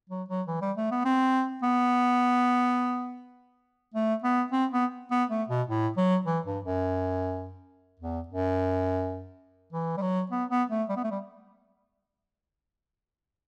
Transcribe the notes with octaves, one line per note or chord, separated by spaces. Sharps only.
F#3
F#3
E3
G3
A3
B3
C4
B3
A3
B3
C4
B3
B3
A3
B2
A2
F#3
E3
G2
F#2
E2
F#2
E3
G3
F#3
B3
B3
A3
G3
B3
A3
G3